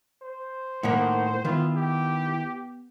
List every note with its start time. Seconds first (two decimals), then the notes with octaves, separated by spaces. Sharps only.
0.22 C5
0.83 A2 D#3 A#3 F#5
1.45 D#3 B3 E4 F4
1.76 G4